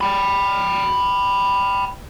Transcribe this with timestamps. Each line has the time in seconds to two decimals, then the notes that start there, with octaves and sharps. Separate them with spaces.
0.01 G5 B5